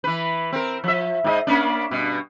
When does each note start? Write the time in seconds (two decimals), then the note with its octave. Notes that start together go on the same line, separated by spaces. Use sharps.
0.04 E3 B4
0.53 C4 A#4
0.84 F3 E5
1.24 G#2 G4 D#5
1.47 A#3 C#4 D4
1.91 G2 B2